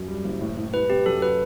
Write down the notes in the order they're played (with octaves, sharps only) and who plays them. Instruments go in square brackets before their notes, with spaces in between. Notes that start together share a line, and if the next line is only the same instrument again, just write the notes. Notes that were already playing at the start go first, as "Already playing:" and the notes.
Already playing: [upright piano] F#2
G3
F#1
A2
A2
[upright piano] C2 [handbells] B4
[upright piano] C3 [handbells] G4
[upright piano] F#2 [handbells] A4
[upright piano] F#3 [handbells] B4